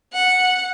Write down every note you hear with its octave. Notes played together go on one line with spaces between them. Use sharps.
F#5